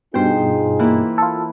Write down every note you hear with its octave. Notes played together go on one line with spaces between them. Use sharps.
G2 B2 D#4 F4 G#4 C5 G5
E3 A#3 E4
F4 A4